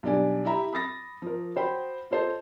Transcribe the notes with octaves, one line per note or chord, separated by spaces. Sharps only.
B1 G3 D4 D5 G#5
E4 G4 E5 A#5 B5
B5 D#6 A6 A#6
F3 A#4
F#4 C5 G5 B5
F4 A4 C5 D#5 A5